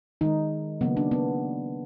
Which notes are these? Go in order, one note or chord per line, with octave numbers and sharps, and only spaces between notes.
D#3 G#3 D#4
C#3 F#3 A#3 B3
D4
B3